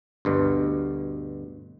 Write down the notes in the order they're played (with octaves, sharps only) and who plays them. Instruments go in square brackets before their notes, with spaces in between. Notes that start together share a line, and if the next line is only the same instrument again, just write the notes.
[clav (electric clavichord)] D2 G2 B2